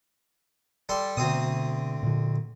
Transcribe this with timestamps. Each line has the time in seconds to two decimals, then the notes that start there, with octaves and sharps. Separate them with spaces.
0.89 G3 A4 C6
1.17 D2 B2 C4 D#6
2.03 A#2 D3